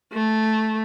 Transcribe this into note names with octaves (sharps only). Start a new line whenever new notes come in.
A3